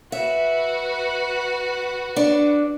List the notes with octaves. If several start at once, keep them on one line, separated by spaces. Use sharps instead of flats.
F#4 B4 E5
D4